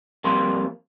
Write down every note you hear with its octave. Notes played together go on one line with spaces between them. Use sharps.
F2 G3 A#3 C6